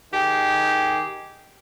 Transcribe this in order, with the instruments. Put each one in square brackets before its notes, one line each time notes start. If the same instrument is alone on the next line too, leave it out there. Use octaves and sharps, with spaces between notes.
[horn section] D#3 G4 G#4